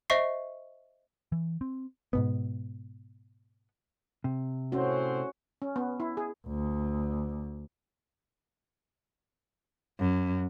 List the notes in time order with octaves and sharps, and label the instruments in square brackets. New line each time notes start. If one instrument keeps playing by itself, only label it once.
[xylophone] C5 D#5 E5 C#6 C7
[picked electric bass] E3
C4
G#2 B2 B3
[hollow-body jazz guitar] C3
[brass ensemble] A2 C4 C5 [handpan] C#4 F#4
[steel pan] C#4
B3
E4
G#4
[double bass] D2
[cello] F#2